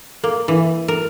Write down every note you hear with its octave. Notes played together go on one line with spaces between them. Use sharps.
A#3
E3
A#4